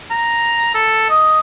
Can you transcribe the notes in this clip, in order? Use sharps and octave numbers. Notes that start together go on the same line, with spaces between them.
A#5
A4
D#5